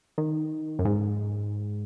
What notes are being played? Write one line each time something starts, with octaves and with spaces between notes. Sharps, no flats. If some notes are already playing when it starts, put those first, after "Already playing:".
D#3
F#2
G#2